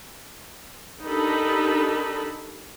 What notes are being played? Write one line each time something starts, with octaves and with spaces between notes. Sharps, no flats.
D4 D#4 G4 A4 A#4 B5